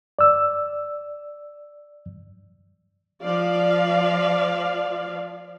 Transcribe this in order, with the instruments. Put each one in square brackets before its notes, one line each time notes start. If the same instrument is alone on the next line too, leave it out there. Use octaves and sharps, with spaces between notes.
[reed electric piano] D5 E6
[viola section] F3 D5 F5